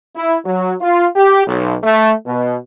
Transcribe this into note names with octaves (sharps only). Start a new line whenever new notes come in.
E4
F#3
F4
G4
B1
A3
B2